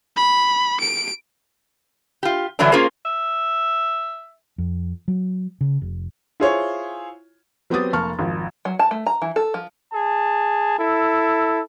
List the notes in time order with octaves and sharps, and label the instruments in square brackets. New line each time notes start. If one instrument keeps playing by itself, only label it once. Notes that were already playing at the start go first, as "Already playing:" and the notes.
[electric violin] B5
D7
[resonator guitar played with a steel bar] F4 G4
D3 E3 F#3 G3 A3 D4
A#3 C#4 F4 G#4 A#4 C5
[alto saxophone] E5
[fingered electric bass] F2
F#3
C#3
F1
[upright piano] E4 F4 G#4 C5 C#5
[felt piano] F#3 B3 C4 G4 D#6 A6
F1 A#3 A5 C#6 F6
G#1 F2
[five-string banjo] F#3
A5
A3
A#5
E3
A4
F3
[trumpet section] G#4 A5
E4 A4